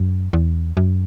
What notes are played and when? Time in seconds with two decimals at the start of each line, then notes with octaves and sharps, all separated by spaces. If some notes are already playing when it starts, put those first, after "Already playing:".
Already playing: F#2
0.33 E2
0.77 F#2